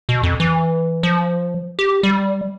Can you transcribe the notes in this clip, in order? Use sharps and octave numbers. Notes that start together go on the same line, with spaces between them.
B2
F2
E3
F3
G4
G3